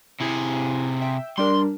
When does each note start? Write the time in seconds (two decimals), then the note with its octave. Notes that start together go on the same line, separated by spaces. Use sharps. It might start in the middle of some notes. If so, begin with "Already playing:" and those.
0.21 C3 E4 G#4
1.01 E5 G5
1.38 G3 D4 A#4 C6